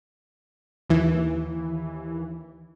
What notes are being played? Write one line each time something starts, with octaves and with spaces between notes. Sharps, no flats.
D#2 E3